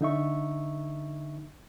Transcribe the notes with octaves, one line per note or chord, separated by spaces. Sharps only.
D3 D#4 E5 C#6